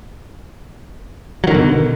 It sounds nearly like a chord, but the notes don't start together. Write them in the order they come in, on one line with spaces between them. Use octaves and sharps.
F#3 D#3 D3 B2